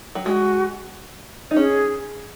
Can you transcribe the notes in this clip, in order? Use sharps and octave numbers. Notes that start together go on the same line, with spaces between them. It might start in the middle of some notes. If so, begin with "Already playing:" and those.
F#3
G#3 F#4
D#4
C#4 G#4